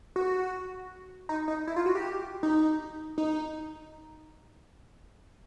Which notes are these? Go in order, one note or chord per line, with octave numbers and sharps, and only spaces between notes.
F#4
D#4
D#4
E4
F4
F#4
G4
D#4
D#4